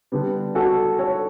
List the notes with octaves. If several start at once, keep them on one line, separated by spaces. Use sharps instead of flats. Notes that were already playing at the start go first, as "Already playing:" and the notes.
D3 G3 B3
F#4 A4
A4 C#5